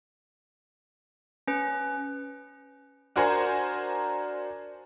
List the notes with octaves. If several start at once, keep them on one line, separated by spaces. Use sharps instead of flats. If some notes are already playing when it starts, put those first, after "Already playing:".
C#4 B4
D4 F#4 A#4 C5 G#5